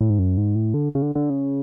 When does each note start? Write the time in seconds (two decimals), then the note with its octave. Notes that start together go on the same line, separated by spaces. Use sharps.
0.01 A2
0.10 G#2
0.19 F#2
0.37 G#2
0.55 A2
0.74 D3
0.95 C#3
1.02 D3
1.15 D3
1.30 C#3